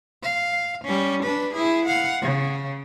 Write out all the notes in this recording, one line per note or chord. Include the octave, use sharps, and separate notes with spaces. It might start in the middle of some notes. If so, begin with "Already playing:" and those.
F5
G3 C#4
D4 B4
E4 G#4
F5 F#5
C#3